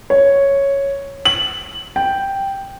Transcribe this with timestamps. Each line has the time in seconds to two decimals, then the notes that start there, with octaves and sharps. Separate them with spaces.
0.10 C#5
1.25 F#7
1.96 G5